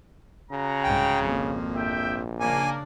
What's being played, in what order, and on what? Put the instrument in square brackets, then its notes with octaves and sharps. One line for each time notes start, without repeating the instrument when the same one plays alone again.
[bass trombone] C#3 [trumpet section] F#4 G#4 A#5
[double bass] C2 G#2 [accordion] G5
[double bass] G#1 A#3 [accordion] F2
[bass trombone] A#1 [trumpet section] E5 G5
[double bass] C#3 D4 [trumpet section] A#3 [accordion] G#5